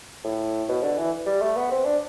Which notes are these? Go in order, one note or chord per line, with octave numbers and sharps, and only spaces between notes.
A2
B2
D3
E3
G3
A3
B3
C4
D4